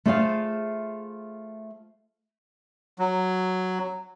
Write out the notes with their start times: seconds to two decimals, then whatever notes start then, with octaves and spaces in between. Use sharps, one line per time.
0.05 A3 F4 G#4 C5 D#5 F5
2.99 F#3